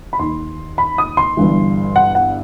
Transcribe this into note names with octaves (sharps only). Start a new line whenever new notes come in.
B5
D#2 D#3 C6
B5
D#6
C6
G1 G2 E3
F#5
F#5